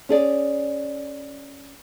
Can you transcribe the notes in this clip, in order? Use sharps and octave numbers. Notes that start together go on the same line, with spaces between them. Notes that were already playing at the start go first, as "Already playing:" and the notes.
C#4 G#4 D5